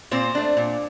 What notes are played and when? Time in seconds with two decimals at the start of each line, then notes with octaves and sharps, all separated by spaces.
0.11 A#2 C4 C5
0.35 A3 D4
0.57 A#2